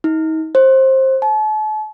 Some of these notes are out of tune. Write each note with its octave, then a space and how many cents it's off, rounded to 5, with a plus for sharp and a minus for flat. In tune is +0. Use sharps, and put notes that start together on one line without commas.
D#4 +35
C5 +20
A5 -40